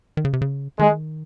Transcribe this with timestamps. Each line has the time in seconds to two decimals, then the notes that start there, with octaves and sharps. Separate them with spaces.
0.17 D#3
0.25 C#3
0.33 C3
0.42 C#3
0.79 D#3 G#3